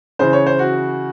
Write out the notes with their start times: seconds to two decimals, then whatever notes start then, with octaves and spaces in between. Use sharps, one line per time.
0.19 C#3 E3 C5
0.33 C#5
0.46 C5
0.59 F#4